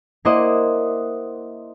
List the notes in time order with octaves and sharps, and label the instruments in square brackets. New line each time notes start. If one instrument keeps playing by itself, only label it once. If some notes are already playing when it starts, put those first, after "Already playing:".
[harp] A#3 E4 C5 D5 D#5 F#5